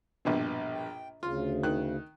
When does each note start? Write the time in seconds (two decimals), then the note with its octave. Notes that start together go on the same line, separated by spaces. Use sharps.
0.25 A#1 G2 B2
0.73 G5
1.23 D2 C#3 F4
1.63 D#3 F#6